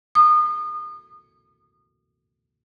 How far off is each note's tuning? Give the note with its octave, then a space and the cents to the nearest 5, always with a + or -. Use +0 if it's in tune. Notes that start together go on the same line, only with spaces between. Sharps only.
D#6 -30